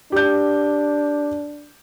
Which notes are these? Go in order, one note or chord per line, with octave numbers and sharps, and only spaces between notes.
D4 G4 G6